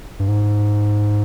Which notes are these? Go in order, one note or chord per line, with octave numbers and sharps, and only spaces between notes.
G2
G#2